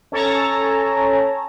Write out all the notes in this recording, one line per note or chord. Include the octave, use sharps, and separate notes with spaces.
C#4 A4 C#5 A5 A#5